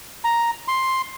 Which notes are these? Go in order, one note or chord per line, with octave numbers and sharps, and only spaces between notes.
A#5
C6